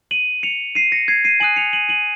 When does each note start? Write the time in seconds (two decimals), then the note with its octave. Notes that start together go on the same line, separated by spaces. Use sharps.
0.11 D#7 F#7
0.43 C#7 F7
0.75 C7 D#7
0.92 A#6 C#7
1.08 G#6 C7
1.25 C7 D#7
1.40 G#5 D#6 F#6 D#7 F#7
1.56 C#7 F7
1.73 D#7 F#7
1.89 D#7 F#7